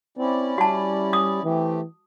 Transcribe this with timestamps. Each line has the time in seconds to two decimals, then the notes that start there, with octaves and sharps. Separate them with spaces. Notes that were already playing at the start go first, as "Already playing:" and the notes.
0.18 C4 C#4 E4 D5
0.58 G3 F#4 A5
1.13 D#6
1.43 E3 A3 C4 G4